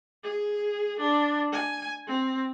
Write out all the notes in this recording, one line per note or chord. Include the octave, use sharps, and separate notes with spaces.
G#4
D4
G#5
C4